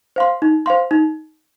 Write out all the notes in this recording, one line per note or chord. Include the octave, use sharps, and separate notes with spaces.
C5 F5 C6
D#4
C5 F5 C6
D#4